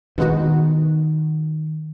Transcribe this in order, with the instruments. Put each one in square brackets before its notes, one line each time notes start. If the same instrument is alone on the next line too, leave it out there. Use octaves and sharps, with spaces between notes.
[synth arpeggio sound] B2 G#3 B3 D#4 F#4 [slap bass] D#3